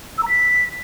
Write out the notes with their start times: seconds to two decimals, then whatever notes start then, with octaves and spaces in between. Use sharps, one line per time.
0.18 E6
0.23 A#5
0.29 B6